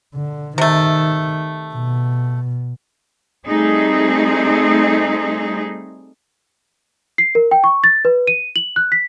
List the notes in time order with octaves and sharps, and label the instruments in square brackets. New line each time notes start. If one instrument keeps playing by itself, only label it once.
[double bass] D3
[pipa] C3 A3 [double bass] D#3
[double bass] B2
[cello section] G3 A3 C4 D#4 G#4
[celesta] C7
A#4
G5
C#6
A6
B4
D#7
F#7
F#6
B6